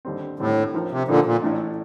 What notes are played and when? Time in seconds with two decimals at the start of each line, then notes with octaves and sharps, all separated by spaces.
0.05 D#2 D3 G3 C4
0.39 D#2 A2 D3 G3 C4
0.74 F3 C4 D#4 A#4
0.91 C3
1.08 A#2 D3 F3 C4 D#4 A#4
1.25 A#2
1.42 A1 A2 A3 D4